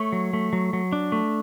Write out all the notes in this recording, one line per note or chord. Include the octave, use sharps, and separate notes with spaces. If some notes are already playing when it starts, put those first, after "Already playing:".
Already playing: A3 C#5
F#3
A3
F#3
F#3
D4
A3